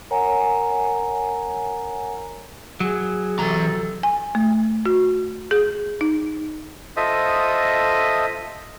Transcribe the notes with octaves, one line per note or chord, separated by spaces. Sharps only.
A#4 C#5 F#5 G#5 A#5
F#3 G#4
C3 E3 A4 A#5
G#5
A3
F#4
G#4
D#4
F4 A4 C5 D#5 E5 D#6